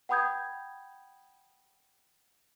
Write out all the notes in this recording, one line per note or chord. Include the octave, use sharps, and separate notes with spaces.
F#5 G5 B5 D#6 G6 G#6